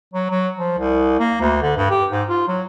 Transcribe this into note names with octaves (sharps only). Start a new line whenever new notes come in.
F#3
F#3
F3
C2
A#3
D2
D3
G2
G4
G#2
F4
F#3